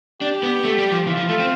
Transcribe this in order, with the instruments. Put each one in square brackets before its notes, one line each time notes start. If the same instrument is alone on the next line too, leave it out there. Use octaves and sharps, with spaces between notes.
[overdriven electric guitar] D4 [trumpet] G4
[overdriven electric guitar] B3
A3
G3
F3
[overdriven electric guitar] E3 [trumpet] F4
[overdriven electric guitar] F3
A3
C4